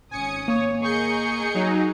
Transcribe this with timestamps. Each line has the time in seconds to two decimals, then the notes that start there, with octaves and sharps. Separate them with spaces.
0.11 G#1 C#4 G#5 D#6 C#7
0.48 A#3 C#5
0.82 G#4 A#4 D#5 C#6 G6 C#7
1.54 F#3 D#4